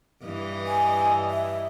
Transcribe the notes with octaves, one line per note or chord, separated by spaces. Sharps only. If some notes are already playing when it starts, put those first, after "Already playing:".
G2 E3 D#5
G#5
E5